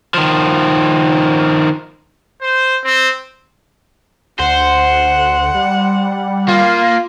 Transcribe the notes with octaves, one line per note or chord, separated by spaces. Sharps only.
D#3 F3
C5
C4
D2 C5 F#5
G3
A#3 F4